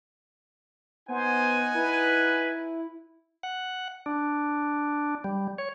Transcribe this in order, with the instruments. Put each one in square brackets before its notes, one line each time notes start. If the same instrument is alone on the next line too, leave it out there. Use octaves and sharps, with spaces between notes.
[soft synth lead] B3 [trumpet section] D#4 F#5 G#5 [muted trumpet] C5
[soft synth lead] E4 [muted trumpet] B4
[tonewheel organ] F#5
D4
G3
C#5